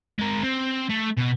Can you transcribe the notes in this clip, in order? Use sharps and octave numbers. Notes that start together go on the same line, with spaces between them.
G#3 A#4
C4
A3
B2 B3